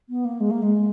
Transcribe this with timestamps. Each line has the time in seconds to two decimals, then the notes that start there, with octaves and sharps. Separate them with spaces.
0.09 B3
0.25 A#3
0.40 G#3
0.50 A#3
0.62 G#3